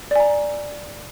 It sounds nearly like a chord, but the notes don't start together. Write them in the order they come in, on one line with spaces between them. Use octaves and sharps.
D5 G#5 A#5